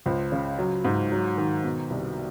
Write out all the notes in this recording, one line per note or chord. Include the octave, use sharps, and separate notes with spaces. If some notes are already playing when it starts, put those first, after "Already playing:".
C#2 C5
C#3
F#3
G#2
F#3
D#3
B2
C2